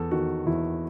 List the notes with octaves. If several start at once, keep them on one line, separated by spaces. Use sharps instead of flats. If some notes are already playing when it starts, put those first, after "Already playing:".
Already playing: E2 A4
D#3 F#4
E2 E4